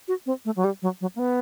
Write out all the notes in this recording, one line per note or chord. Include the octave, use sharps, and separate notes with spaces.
F#4
C4
A3
F#3
G3
F#3
F#3
A#3
B3